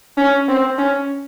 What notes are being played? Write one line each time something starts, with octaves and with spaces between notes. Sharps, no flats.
C#4
C4
C#4